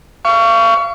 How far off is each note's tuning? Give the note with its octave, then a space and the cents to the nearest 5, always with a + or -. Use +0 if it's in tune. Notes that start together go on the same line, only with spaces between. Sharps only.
F5 -35 C#6 +25